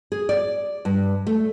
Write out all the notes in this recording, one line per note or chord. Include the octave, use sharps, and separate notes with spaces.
G#4
D5
G2
A3